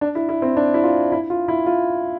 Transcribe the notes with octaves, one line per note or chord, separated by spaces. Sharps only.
D4
E4
E4
C4
D4
E4
F4
E4
F4
E4
F4